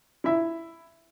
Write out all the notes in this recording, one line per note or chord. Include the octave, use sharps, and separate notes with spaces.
E4 E5